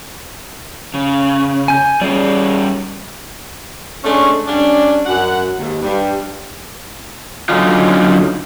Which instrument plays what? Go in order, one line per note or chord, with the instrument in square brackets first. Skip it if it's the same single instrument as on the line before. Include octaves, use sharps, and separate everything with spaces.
[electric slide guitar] C#3
[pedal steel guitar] G#5 G6
[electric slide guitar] G3 C#4 [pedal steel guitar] G#4 D5
[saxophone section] G#3 A3 C#4 D4
G3 C#4 D4
F#2 F#5
D#2 G#2
G2 G3
[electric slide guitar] D3 F#3 C#4 D#4 F4